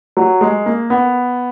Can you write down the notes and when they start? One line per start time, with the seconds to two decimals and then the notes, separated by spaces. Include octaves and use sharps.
0.17 F#3
0.41 G#3
0.66 A#3
0.90 B3